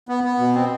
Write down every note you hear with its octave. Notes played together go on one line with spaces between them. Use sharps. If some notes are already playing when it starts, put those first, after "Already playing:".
B3
B3
B2
C4